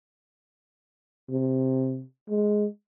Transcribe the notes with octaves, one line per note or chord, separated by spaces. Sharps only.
C3
G#3